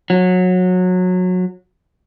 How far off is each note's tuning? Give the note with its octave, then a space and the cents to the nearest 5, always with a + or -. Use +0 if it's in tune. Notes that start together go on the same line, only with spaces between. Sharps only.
F#3 -20